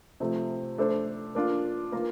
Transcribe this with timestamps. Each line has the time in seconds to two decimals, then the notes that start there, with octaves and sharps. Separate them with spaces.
0.20 C3 F3 A3 C4
0.78 A3 D4 A4 C5
1.35 A#3 D4 F4
1.92 A#3 F4 A#4